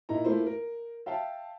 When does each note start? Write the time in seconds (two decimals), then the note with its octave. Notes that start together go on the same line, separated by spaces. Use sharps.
0.09 A#2 D#4 E4 A#5
0.24 A3 A#3 E4 F4 C5
0.46 A#4
1.06 E5 F5 G5 A5